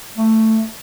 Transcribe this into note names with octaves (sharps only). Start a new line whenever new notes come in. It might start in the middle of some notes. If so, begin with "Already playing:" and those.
A3